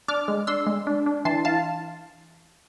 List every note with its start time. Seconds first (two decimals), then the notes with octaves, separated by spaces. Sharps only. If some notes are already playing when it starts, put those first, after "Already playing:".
0.08 D4 D6 F6
0.28 G#3
0.47 D4 C6 E6
0.67 G#3
0.87 D4
1.06 D4
1.25 E3 A5 C6
1.45 E3 F5 A5